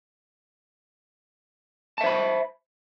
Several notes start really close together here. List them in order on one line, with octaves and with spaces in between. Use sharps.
A5 E5 C5 B5